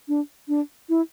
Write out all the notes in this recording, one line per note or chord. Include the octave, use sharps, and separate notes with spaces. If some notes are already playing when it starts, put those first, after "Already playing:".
D4
D4
E4